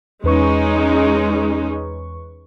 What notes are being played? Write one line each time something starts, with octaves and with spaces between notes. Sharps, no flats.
E2 G#3 C#4 D#4 B4 C#6